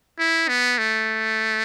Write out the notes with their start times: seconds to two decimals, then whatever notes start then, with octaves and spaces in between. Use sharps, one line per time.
0.19 E4
0.48 B3
0.78 A3